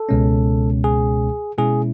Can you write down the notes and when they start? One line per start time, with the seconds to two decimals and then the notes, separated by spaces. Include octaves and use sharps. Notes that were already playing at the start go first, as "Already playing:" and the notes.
Already playing: A4
0.09 C#2 B2 G#3 C#4
0.84 G#4
1.58 B2 G#3 C#4 E4 G#4